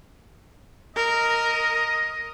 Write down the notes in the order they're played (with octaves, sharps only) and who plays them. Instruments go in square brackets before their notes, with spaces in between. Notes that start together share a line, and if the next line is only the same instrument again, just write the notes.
[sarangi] A#4 [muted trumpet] D#5